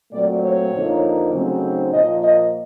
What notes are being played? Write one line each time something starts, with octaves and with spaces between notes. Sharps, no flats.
A#2 F#3 A3 C4 D5
C#5
F2 D3 F3 A#3 D#4
C#3 F#3 A3 C4 D#4
A#2 F3 A#3 D#5
D#5